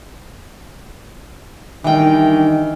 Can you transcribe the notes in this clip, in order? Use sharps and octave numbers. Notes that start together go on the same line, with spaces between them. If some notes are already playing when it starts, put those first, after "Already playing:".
D#3 E3 G3 D4 G5